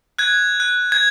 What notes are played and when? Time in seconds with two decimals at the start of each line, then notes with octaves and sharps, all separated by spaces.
0.19 F#6 G#6
0.60 F#6
0.92 G#6